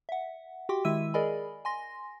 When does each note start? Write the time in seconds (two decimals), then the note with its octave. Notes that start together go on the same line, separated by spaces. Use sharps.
0.09 E5 F#5
0.69 F#4 G4 G5 C6 D6
0.85 D#3 G#3 E4 E5 E6 D#7
1.14 G#4 A#4 D5 D#5 G#5 B5
1.65 G#5 C6 A#6